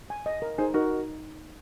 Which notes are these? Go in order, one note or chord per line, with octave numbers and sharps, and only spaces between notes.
G#5
D#5
A#4
D#4 G#4 C5
D#4 F#4 A#4